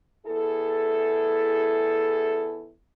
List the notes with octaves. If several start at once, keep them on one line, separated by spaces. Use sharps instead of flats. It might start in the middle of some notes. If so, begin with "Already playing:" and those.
E2 E4 G#4 A4